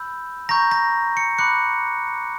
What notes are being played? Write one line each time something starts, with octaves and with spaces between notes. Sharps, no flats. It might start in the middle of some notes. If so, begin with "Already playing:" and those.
Already playing: B5 E6 G6
A#5 C#6 G6 A#6
A#6
C#7
B5 D6 F#6 C#7